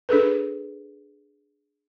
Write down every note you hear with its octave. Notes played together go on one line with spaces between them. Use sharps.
D4 G#4 A4 B4